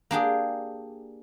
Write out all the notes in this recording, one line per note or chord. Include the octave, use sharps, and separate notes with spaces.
A#3 D4 G4 G#4